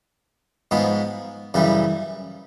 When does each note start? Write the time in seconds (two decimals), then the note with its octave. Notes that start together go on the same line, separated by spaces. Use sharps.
0.71 G#2 F3 G#3 B3
1.54 F#2 C#3 E3 G3